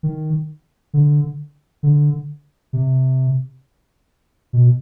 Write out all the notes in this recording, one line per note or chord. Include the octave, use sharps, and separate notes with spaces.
D#3
D3
D3
C3
B2